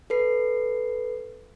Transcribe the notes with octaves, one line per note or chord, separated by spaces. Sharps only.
A4 B4 C7